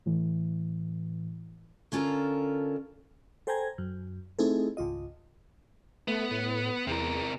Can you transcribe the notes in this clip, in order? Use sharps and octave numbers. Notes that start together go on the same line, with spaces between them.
A2 E3
D3 C#4 F4 A4 A#4
A4 C5 G5 G#5 A#5 G#6
F#2
A3 C4 D#4 E4 G#4 A4
G#1 C#2 F4 D#5
A3 B3
A2
E2 C3 A#4